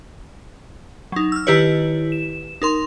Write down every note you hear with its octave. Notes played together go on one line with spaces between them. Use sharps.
F#3 D#4
E6 F6
D#3 E4 G4 B4 C#5
E7
D#4 A#4 C6